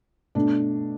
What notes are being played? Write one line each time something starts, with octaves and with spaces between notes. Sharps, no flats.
B2 A3 D4